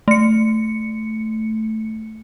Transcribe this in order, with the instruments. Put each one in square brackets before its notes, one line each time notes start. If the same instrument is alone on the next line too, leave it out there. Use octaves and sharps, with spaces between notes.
[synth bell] A3 C#7